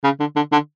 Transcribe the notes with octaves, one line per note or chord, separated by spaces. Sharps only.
C#3
D3
D3
D3